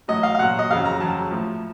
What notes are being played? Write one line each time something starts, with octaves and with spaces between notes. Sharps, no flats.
A2 F#3 D#5
F5
F5
A#2 F#3 F#5
D#5
F2 C#3 F#3 F5
A#5
F2 C#3 F#3 A5
A2 F3